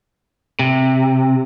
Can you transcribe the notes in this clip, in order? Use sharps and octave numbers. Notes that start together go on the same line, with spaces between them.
C3